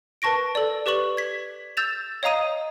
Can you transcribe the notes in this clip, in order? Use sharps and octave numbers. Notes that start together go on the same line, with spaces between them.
A#4 B4 A5 C#6 A#6 D7
A4 D5
G4 B4 D5 C#6 F#7
G#6 B6
E6 G6 A6 E7 F7
C#5 D#5 F5 A#5 D#6 D#7